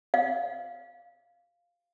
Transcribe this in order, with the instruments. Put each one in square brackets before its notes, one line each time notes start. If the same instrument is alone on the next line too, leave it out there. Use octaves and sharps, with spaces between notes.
[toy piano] F5